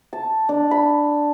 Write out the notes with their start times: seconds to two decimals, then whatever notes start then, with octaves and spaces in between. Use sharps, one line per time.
0.13 A5
0.49 D4
0.71 B5